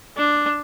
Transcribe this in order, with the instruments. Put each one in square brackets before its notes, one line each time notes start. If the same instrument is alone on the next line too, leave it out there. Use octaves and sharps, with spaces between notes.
[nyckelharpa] D4